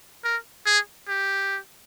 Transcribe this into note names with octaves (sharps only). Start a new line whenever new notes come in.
A#4
G#4
G4